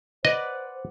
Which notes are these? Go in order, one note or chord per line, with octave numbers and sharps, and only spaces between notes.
B4 C5 D5 D#5 F#5